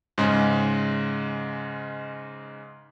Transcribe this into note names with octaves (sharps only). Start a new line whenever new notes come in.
G#2 C#3 G#3